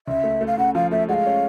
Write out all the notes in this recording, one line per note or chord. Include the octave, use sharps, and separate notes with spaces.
C#2 E5
A3
A3
F5
C#3 F#5
F3 F5
A3 E5
G#3 F5 F#5
C#4